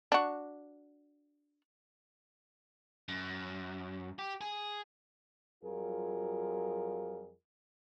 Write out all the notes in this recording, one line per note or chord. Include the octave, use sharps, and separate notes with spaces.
D4 F#4
F#2
G4
G#4
F2 F#3 G3 F4 G#4 A#4